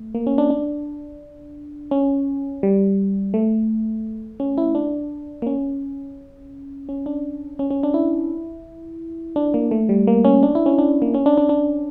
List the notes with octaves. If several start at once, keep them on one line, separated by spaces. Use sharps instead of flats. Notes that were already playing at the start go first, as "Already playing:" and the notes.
Already playing: A3
A#3
C#4
D4
D4
C#4
G3
A3
C#4
E4
D4
A#3
C#4
C#4
D4
C#4
C#4
D4
E4
D4
A#3
A3
G3
A#3
C#4
D4
E4
C#4
D4
A#3
C#4
D4
D4
D4